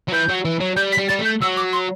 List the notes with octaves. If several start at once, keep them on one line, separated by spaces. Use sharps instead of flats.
F#3
E3 G6
F#3
E3
F#3
G3 G6
B6
G3
G3 A6
A3
G6
F#3 E6
D6
C6